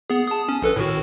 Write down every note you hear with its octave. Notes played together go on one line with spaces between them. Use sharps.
B3 G#4
A5 D#6
C#4
A#1 A4 B4
A2 D#3 F#4